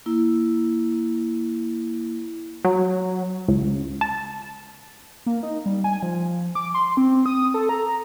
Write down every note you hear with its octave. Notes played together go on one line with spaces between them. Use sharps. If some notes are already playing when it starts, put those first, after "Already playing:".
A#3 E4
F#3
C#2
A5
A#3
D#4
G3
G#5
F3
D6
C6
C4
D#6
A4
A#5